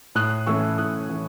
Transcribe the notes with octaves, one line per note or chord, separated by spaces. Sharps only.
A2 D#6 F#6
E3 A3 C#4 C#6 E6
A2 D#6 F#6
E3 A3 C#4